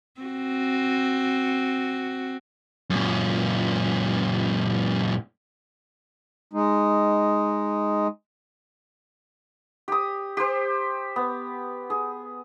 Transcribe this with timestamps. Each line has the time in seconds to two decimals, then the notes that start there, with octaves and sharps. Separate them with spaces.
0.21 C4 F#4
2.90 F#2 A#2
6.53 G#3 D#4
9.88 G4 D#6
10.37 G4 C5
11.16 B3
11.90 G#4